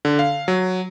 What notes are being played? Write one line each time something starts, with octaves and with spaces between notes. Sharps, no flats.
D3
F5
F#3